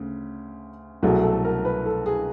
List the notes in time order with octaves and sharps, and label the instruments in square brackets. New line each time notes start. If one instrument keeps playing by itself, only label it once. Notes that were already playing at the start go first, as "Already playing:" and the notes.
Already playing: [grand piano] D2 C#3
C2 B2 F#3 A3 G#4
A4
A#4
B4
A4
G#4